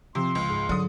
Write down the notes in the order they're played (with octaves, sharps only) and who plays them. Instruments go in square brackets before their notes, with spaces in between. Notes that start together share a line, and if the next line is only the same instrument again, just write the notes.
[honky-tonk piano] C3 [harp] F3 E6 [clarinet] C6
[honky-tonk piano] C#2
[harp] G#2
[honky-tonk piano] D3 D#6 [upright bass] F#3